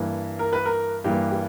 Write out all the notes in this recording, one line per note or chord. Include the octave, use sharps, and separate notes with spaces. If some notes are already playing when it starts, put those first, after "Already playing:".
Already playing: G2 E3 A#3
A#4
B4
A#4
G2 E3 A#3 G4
G4